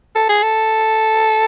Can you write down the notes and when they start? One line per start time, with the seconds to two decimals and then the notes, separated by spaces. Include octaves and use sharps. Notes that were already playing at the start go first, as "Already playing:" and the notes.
0.16 A4
0.29 G#4
0.43 A4